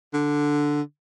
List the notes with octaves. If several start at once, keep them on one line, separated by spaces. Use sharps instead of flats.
D3